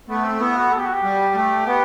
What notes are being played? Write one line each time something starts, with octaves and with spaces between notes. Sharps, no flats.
A3 B3
C4
B3 E4
F#4
A4
G4
F#4
G4
G3
A3 G4
B3 G4